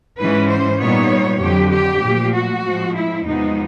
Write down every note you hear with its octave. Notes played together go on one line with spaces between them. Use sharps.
G#2 E3 G#3 C#4 B4
C5
A#2 G3 B3 D#4 C#5
F2 D3 F#3 G4
G4
A#2 F3 A3
F#4
A2 F3 G#3 C4
E4
E2 C3 F3 G#3 B3 D#4